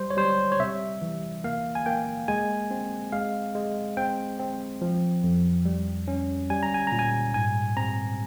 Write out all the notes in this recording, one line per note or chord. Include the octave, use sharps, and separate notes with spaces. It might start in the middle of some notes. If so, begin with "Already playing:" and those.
Already playing: G3 C5
C#5
G3 C5
C#5
C3 E5
E3
A#3 F5
G#5
A#3 G5
G#3 G#5
C4
G#3 F5
G#3
C4 G5
C4
F3
F2
G3
C#4
G3 G#5
A#5
G#5
A#2 A#5
G#5
G#2 G#5
C4 A#5